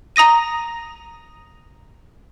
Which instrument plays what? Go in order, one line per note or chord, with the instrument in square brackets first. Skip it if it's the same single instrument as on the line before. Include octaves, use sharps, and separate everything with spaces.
[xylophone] A#5 D#6 A#6 D#7